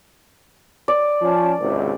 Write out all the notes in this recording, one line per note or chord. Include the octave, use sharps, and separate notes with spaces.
D5
F3 C#4 A5
G#1 C#2 C3